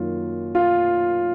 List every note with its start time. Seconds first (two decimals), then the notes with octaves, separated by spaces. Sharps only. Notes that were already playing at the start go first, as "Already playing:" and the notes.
Already playing: F#2 D#3 A#3 F4
0.55 F4